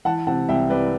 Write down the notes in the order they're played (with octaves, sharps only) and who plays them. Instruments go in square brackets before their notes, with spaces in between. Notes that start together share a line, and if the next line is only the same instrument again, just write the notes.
[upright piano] E3 F#5 A5
C3 F#5 A5
C2 E5 G5
C2 B4 D5